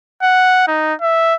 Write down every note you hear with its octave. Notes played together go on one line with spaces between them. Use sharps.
F#5
D#4
E5